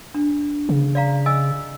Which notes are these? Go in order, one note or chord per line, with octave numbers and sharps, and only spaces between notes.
D4
C#3
D5 F5 A#5
D#5 G#5 E6